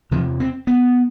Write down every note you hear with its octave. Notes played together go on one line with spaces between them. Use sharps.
E2 C3 F3
C4
B3